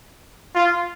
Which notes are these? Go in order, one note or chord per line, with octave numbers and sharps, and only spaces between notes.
F4